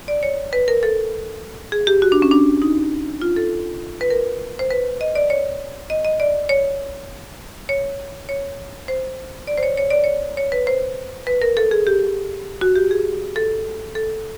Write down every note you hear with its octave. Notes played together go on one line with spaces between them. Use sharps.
D5
C#5
B4
A#4
A4
G#4
G4
F#4
D4
C#4
D4
D#4
F4
A4
B4
A#4
C5
B4
D#5
D5
C#5
D#5
D#5
D5
C#5
C#5
C#5
C5
D5
C5
C#5
C#5
D5
C#5
C#5
B4
C5
B4
A#4
A4
G#4
G4
F#4
G4
G#4
A4
A4